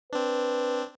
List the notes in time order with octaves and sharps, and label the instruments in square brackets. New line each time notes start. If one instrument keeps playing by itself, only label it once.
[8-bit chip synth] C4 D4 [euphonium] B4